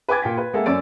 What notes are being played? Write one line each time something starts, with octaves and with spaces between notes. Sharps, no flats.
B4 G5 G#5 D6 G#6 A6
A#2 G5 B6
B4
G#3 A#3 A4 E5 F#5
F#2 C#4 D5 E6 A6 D7